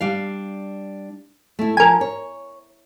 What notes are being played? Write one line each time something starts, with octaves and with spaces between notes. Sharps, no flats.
G3 D4 F5
A3 E4
F3 D4 A#4 G#5
C#5